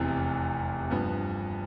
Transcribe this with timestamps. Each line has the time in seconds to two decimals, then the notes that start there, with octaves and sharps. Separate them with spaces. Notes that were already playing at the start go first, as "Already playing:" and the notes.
Already playing: F1 E2 C3 E3
0.90 G2 F3 B3